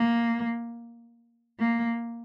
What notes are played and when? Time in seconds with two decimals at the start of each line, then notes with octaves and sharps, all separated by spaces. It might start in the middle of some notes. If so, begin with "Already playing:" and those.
Already playing: A#3
1.59 A#3